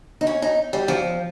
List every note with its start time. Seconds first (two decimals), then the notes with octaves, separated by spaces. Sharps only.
0.21 D#4
0.27 C#4
0.42 D#4
0.73 G3
0.88 F3